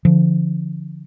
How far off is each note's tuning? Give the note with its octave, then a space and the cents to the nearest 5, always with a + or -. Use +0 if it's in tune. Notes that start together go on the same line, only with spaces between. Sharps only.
D3 +0 F3 -20